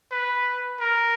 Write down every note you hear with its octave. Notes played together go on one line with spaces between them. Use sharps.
B4
A#4